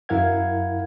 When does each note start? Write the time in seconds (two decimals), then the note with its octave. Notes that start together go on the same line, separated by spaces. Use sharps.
0.09 F#2 E4 A#4 F5 F#5 G#6